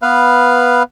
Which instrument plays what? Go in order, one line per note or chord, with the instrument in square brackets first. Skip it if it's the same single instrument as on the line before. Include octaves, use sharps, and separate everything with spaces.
[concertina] B3 B4 F5